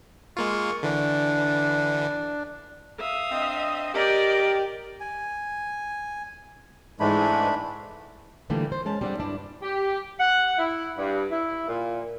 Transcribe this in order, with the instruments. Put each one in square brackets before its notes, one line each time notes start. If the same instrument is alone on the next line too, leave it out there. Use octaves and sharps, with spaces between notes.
[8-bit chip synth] G#3 A#3 F4 [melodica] C#6
[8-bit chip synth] D3 E3 [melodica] D4
[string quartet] E5 F5 D#6
[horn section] C4 D4 D#5
[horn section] G4 [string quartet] A#4 D5 D#5
[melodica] G#5
[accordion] G#2 E3 G#3 [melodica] A3 D4 B5
[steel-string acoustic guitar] A#2 D3 E3 G3 A3 A#3
C5
G#3 C#4 A5
G3 C4 D4 C#5 D5 F#5
G2 D#3 D4 E4
[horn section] G4
F#5
E4
G2
E4
A#2